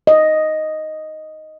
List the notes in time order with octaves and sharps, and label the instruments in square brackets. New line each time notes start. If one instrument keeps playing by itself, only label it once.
[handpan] D#5